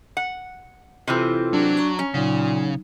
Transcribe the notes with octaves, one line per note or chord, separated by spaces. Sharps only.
F#5
C3 E3 C4 E4 F4 A4
F#3 D4
A#5 C#6
C#4
A#2 C#3 F#3 D#4